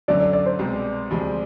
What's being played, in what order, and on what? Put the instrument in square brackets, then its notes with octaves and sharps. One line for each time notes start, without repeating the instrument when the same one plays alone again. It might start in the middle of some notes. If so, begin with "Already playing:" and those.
[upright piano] F#2 D3 F#3 A3 C#4 [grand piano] D5
[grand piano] D5
D5
C5
[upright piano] C2 B2 G#3 C4
D2 C3 F3 G#3